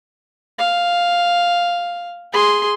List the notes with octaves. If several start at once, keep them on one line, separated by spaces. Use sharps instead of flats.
F5
G#4 C6